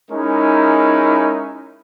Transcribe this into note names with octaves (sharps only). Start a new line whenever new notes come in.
G#3 C#4 D#4 E4 A#4